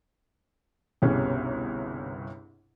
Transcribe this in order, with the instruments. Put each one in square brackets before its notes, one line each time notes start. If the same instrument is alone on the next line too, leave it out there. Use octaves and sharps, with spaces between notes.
[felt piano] G1 C2 B2 C#4 G4 G#4